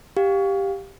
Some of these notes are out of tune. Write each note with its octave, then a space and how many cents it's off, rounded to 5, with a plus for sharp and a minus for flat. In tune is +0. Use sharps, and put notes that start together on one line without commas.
G4 +5 F5 +20